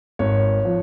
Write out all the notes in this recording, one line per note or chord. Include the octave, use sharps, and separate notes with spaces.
G#1 C#5
F3